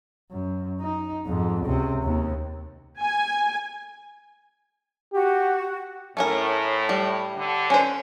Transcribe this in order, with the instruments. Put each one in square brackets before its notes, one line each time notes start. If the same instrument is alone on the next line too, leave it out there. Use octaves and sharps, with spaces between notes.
[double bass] F#2
D#4
F2 G#2
C#2 C3
D#2
[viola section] G#5
[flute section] F#4 [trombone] G4
[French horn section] A2 [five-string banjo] A3 C#4 A#4
[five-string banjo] G3
[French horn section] D3
[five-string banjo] C#4 C5